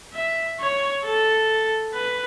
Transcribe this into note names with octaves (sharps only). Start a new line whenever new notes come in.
E5
C#5
A4
B4